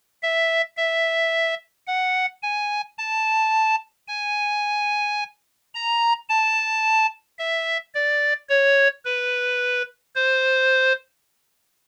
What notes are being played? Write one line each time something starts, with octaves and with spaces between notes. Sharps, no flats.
E5
E5
F#5
G#5
A5
G#5
A#5
A5
E5
D5
C#5
B4
C5